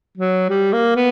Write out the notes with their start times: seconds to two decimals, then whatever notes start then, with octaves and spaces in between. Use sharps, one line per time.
0.17 F#3
0.49 G3
0.73 A#3
0.96 B3